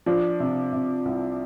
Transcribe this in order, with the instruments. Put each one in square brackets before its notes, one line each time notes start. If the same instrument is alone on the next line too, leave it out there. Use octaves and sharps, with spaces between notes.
[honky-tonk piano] F3 [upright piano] D4
[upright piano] C3
C3
C2